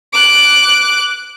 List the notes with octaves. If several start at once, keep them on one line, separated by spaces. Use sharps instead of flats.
D6 F#6